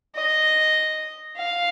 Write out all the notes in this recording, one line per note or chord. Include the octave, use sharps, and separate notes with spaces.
D#5
F5